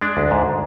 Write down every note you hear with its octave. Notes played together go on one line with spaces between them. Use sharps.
G#3 D4
D2
G#2